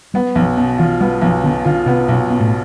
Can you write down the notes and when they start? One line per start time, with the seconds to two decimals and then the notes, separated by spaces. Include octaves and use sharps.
0.14 G3 B3
0.35 B1 F3
0.57 B2
0.78 E3 F4
1.01 G3 B3
1.21 B1 F3
1.43 B2 D3
1.65 D3 F4
1.86 C3 B3
2.08 B1 B2
2.30 B2
2.40 A2